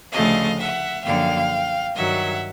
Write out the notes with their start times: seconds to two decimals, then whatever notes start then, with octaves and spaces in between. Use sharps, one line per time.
0.12 D2 C#3 F3 A3 D#5 F5
0.58 E5 F#5
1.04 F#2 D3 F3 A#3 F5 G5
1.95 G2 D#3 F#3 E5 F#5